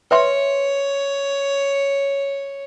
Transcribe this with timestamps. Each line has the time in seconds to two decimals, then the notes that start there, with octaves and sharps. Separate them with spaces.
0.11 B4 C#5 E5 C6